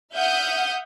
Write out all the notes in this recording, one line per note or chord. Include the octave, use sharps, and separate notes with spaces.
E5 F#5 D#6 F6 G6